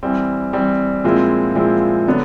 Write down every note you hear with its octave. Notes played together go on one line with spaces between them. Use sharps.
E3 G3 C4
E3 G3 C4
A#2 F3 G#3 C4 E4
A#2 F3 G#3 C4 E4
D3 F#3 B3 D4